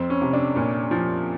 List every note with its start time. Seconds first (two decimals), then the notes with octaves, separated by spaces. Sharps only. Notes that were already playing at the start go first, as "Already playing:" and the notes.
Already playing: F2 C4
0.10 C#4
0.22 C3
0.33 D4
0.56 A#2 C#4
0.91 F3